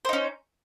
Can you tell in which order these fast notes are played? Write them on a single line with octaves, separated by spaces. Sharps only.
C5 D#4 C#4